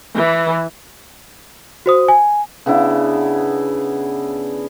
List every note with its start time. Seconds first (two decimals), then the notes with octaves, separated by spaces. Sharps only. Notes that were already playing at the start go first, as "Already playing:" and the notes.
0.16 E3
1.86 F#4 C5 D#6
2.09 G#5
2.66 C#3 B3 D4 E4